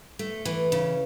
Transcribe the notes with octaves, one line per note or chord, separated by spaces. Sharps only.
A3
E3
C#3